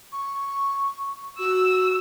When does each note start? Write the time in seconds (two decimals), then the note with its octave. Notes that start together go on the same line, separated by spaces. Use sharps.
0.12 C#6
1.39 F#4 E6